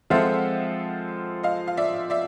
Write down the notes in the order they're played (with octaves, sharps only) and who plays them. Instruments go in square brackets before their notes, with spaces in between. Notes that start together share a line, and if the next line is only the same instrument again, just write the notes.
[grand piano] F3 G#3 C4 F4 A4 [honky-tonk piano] E5 F#5
[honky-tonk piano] D#5 F5
F5
D5 E5
D5 E5